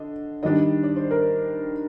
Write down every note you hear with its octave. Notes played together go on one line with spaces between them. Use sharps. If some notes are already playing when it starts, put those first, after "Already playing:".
Already playing: D3 D4 D#5
D#3 G3 D4 D#5
D5
C5
A#4